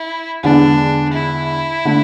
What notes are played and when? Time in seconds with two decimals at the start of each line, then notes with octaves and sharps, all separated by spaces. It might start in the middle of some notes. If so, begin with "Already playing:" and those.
Already playing: E4
0.43 E2 D3 G#3 D4
1.14 E4
1.85 D3 A3